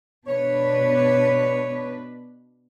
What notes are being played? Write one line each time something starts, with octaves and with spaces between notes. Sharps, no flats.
B2 D4 B4 C#5